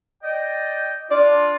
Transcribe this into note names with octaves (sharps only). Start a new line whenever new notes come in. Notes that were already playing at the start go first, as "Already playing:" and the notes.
D5 D#5 G5
D4 F4 D5